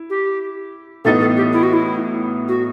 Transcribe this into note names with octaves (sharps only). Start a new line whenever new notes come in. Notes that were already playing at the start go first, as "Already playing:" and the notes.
Already playing: E4
G4
A2 E3 B3 D#4 A4
A4
G4
E4
F#4
E4
F#4